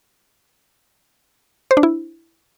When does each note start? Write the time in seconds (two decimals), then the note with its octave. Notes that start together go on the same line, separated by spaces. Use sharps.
1.71 C5
1.77 D4
1.83 E4